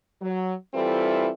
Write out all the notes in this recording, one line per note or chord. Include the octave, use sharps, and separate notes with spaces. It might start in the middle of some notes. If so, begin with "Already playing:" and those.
F#3
E3 G3 C4 E4 F4 A4